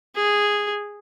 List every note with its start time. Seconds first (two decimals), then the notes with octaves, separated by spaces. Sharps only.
0.15 G#4